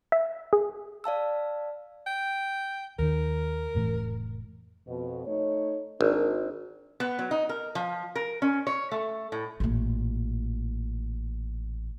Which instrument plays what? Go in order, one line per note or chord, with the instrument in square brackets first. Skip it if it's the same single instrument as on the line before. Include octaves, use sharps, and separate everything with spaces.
[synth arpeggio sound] E5
G#4
[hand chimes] D5 F5 A5 E6
[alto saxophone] G5
[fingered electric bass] D#2 D#3 [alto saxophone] A#4
[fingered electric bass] F1 A2 E3
[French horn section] F2 B2
A3 D#4 C#5
[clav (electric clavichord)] G#1 [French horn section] D4 A#4
[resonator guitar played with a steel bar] B3
F#3
D#4
A#4
F3
A#4
C#4
C#5
A3
A2
[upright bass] A1 A#2